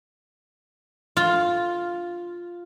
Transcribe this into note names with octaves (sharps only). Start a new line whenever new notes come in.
F4